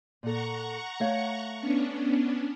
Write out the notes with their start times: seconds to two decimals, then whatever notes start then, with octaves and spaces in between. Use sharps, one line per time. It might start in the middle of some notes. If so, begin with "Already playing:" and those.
0.23 A#2 A4 F#5 A#5 C#6
1.00 A3 C#5 F5
1.60 B3 C#4 D4